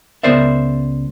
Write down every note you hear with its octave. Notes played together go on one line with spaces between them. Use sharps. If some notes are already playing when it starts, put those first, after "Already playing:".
C#2 B3 A#4 C5 D5 E5